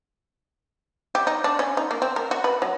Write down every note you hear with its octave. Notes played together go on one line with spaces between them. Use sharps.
G4
D#4
D4
C#4
D#4
A#3
C4
A#4
F#4
B4
F#3